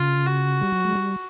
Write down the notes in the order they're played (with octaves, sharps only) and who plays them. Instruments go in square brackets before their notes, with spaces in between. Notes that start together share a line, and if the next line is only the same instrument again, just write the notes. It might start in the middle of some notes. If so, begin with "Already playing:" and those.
Already playing: [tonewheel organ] C#3 [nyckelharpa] F4
[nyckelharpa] F#4
[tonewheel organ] G3
F#3
G#3
G3